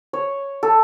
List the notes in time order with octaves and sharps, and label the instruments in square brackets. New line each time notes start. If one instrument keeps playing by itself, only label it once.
[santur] C#5
A4